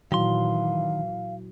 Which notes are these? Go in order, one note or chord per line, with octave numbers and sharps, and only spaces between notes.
A#2 D#3 E3 F#3 E4 F5 C6